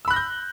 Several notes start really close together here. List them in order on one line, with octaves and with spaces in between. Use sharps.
E6 B5 F#6 A#6 G6